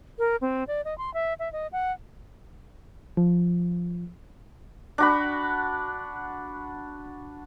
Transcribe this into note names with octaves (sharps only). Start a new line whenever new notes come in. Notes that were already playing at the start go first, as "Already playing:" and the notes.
A#4
C4
D5
D#5
C6
E5
E5
D#5
F#5
F3
D4 F#4 B5